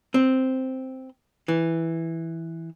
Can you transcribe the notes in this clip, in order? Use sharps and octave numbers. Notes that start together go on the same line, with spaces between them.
C4
E3